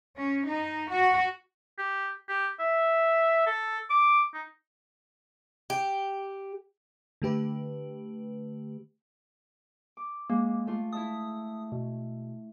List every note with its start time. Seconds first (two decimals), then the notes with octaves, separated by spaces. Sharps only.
0.18 C#4
0.48 D#4
0.92 F#4
1.78 G4
2.29 G4
2.59 E5
3.46 A4
3.90 D6
4.34 D#4
5.70 G4
7.22 D3 A3 G4 B4
9.97 D6
10.30 G#3 A#3
10.67 A3 F4
10.93 E4 E5 A5 D#6
11.72 B2